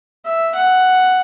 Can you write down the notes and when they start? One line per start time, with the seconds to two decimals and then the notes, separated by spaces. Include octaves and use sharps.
0.26 E5
0.55 F#5